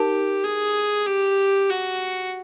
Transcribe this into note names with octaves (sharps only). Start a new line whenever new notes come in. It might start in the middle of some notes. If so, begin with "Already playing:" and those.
Already playing: D#4 G4 A#4
G#4
G4
F#4